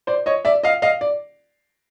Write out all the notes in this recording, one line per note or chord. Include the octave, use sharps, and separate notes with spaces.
C5 D5
C#5 D#5
D5 E5
D#5 F5
D#5 F5
D5